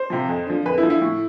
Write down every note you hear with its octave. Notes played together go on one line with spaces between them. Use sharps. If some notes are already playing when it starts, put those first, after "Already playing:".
Already playing: C5
C3 F3
F2
D3 F3
F2 B4
E4
D3 F3
E4
A2